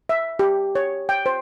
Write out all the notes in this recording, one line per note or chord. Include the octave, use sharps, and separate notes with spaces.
E5
G4
C#5
G5
C5